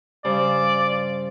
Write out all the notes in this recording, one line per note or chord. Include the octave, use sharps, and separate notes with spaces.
G2 C#3 C5 D5